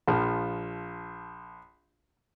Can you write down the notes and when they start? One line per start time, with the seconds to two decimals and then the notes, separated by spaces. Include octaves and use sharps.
0.08 A#1 F3